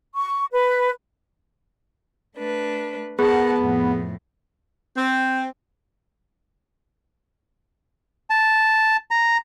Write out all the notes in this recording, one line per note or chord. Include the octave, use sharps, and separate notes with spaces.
C#6
B4
A3 D4 B4
B3 G#4 A#4 F#5 A5
F2 A2
C4
A5
A#5